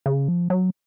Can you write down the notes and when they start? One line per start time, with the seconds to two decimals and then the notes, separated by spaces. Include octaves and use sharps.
0.06 C#3
0.28 F3
0.50 F#3